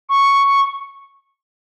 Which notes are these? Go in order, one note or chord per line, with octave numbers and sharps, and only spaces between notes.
C#6